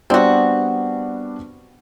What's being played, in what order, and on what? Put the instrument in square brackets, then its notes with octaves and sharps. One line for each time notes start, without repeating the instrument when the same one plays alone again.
[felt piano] G3 B3 D4 [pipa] C4 F#4